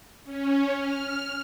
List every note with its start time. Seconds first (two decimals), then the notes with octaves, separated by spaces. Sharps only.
0.25 C#4
0.75 F6